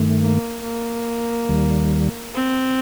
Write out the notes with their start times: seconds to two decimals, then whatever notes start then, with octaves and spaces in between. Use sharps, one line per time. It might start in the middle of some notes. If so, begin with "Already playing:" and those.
Already playing: G2 D#3 A3
0.21 A#3
0.63 A#3
1.49 D#2 D#3 G3
2.35 C4